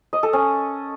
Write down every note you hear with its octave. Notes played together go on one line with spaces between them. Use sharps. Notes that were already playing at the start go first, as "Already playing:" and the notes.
D#5
A4
C#4